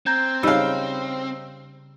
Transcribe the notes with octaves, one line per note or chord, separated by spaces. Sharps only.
C4 A#5 G6 G#6
C#3 G3 D#4 F5 E6